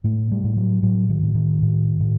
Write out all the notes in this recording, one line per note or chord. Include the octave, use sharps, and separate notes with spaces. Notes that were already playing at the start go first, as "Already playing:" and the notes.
A2 A3
G3
A2
F#3
A2 F#3
D#3
A2
D#3
A2
A2